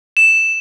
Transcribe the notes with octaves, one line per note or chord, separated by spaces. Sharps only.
E7